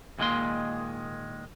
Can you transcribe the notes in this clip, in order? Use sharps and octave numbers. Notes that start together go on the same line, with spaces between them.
D#2 A#2 D#3 G#3 A#3 C6